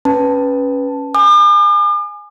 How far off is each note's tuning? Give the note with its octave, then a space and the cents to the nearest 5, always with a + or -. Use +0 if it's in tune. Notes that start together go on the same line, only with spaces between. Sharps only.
C#4 +0 B4 +0 A5 +0
G#5 +0 D6 +45